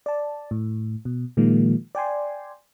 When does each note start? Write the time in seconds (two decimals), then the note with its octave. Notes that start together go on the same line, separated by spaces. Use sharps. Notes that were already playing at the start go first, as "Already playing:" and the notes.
0.06 D5 A5
0.51 A2
1.05 B2
1.37 A#2 D#3 F3 G#3 A#3
1.95 D5 G5 G#5 C6